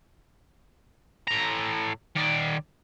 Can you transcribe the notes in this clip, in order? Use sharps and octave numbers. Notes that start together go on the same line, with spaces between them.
A2 A#5
D#3 D5